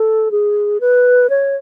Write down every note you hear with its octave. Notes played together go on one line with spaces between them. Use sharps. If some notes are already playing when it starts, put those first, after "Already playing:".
Already playing: A4
G#4
B4
C#5